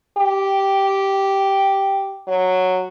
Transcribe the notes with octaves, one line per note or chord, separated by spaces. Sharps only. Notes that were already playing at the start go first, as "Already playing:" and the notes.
G4
F#3